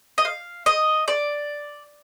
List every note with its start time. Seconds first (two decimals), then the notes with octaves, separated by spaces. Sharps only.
0.18 D#5
0.25 F5
0.66 D#5
1.08 D5